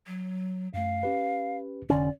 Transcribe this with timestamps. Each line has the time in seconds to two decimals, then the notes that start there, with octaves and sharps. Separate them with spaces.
0.07 F#3
0.74 F#2 A3 F5
1.03 C#4 G4 B4
1.90 F1 D3 C#4 D5